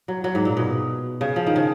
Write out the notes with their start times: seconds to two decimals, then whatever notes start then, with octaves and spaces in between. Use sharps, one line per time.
0.08 F#3
0.24 F#3
0.35 G#2
0.45 A#2
0.57 B2
1.21 C#3
1.36 F3
1.47 D#3
1.56 C#3